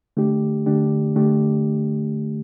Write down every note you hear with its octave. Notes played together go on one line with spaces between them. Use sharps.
D3 A3 D4 G4
D3 A3 D4 G4
D3 A3 D4 G4